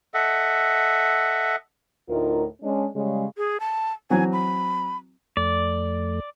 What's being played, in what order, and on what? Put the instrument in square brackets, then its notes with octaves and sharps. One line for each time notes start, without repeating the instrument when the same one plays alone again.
[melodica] A4 D#5 E5 F#5
[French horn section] D2 A2 D#4 F4 A#4
G#3 C#4 D4
C#3 G3 G#3
[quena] G#4
A5
[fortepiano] E3 F#3 C4 [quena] G#5
[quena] B5
[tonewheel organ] F2 A3 [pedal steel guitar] D5